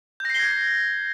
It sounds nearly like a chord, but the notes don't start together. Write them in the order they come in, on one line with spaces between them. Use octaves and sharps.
G6 A#6 C7 G7 G#6